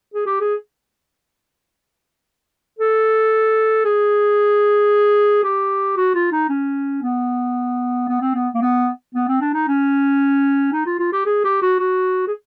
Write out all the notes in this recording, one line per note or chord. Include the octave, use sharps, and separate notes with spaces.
G#4
G4
G#4
A4
G#4
G4
F#4
F4
D#4
C#4
B3
B3
C4
B3
A#3
B3
B3
C4
D4
D#4
C#4
D#4
F4
F4
G4
G#4
G4
F#4
F#4
G#4